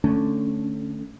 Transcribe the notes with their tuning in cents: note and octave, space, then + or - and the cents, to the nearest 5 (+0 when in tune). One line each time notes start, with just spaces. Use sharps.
D3 +0 A3 +0 C#4 +0